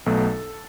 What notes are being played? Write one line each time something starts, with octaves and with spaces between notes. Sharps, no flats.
B1 B2 F#3 A3 A4